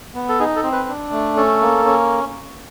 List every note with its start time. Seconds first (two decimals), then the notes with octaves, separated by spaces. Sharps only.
0.15 B3
0.29 A4
0.40 D#4 G#4
0.56 A4
0.63 C4
0.72 B4
0.89 D4
1.12 A3
1.36 C#4 A4
1.61 A#3
1.85 C#4